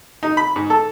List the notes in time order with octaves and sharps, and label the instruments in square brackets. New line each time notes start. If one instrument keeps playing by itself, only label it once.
[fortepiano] D#4
B5
G#2
A4